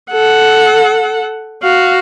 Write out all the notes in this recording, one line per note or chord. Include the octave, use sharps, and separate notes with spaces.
A4 F#5
F#4 F5